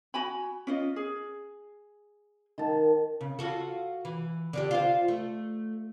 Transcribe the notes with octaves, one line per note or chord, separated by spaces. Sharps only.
F#4 G#5 B5
C#4 F4 D#5
G#4
D#3 A5
C#3
F4 F#4 A4
E3
D3 D4 G4
F4 C5
A3